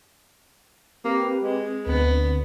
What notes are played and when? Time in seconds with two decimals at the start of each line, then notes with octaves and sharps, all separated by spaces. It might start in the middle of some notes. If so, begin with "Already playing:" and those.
1.05 A#3 C4 G4 B4
1.43 G#3
1.86 D2 B3